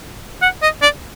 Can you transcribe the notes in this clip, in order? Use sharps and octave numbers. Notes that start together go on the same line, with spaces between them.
F#5
D#5
D5